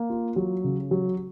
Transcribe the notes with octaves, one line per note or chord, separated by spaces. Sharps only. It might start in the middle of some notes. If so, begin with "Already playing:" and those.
Already playing: A#3
F4
F#3
C#3
F#3